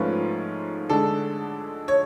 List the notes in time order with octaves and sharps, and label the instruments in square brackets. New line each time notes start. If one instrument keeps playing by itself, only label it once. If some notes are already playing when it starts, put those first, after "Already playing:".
Already playing: [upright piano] G#2 F3 A3 C#4 F4 [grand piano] B4
[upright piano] D3 G#3 D4 [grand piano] A4
[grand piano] C#5